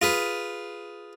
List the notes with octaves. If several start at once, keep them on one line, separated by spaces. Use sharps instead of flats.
F4 G#4 B4